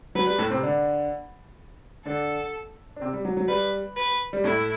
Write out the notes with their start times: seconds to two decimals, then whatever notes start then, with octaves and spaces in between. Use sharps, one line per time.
0.15 F#3 B4
0.27 G3
0.38 A2 A3
0.50 C3 C4
0.63 D3 D4
2.05 D3 D4 A4
2.96 D4
3.01 C3 C4
3.13 G3
3.25 F#3
3.37 F#3
3.48 G3 B4
3.97 B4
4.33 G3
4.44 A2 A3 E4